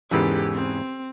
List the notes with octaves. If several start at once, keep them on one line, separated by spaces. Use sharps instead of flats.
E2 G#2 C#3 E3 G4 A4 B5
C4